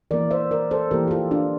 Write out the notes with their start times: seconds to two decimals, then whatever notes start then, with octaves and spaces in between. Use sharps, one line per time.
0.11 E3 A#3 A#4 D5
0.31 C5 E5
0.51 A#4 D5
0.71 A4 C5
0.91 E3 A#3 G4 A#4
1.08 G4
1.11 F4 A4
1.31 D4 F4